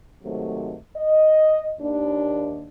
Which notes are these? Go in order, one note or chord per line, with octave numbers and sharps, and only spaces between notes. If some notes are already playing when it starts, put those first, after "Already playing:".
G#2 C3 D#3 F#3 A3
D#5
D#2 D4